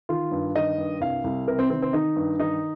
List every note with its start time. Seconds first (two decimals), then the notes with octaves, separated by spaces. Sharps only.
0.09 D#3 F4
0.31 G2
0.55 D#3 D#5
0.78 G2
1.00 C2 F5
1.24 C2
1.47 C3 A#4
1.59 C4
1.70 D#3 C4
1.82 C4
1.93 D#3 D#4
2.16 G2
2.39 D#3 D#4